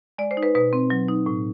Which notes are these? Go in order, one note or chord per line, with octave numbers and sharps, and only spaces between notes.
G#3 D5
C5
D#4
B4
B2 B4
C4
F#3
D#4
A2